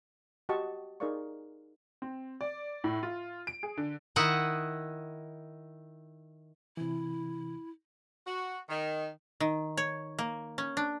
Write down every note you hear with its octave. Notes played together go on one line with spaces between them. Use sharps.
F#4 G4 D#5 F#5 A5 C#6
D#4 G#4 A#4 D5 F5 C#6
C4
D5
A2
F4
D7
G#4
D3
D#3 E4 D#5 F#5
C3 E3 E4
F#4
D#3
D#3
C#5
A#3
C#4
D4